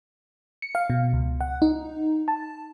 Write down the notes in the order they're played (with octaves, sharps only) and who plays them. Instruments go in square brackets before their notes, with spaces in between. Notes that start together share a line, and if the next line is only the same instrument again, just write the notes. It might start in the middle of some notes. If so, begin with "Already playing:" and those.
[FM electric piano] C#7
F5
B2
C#2
F#5
D#4
A5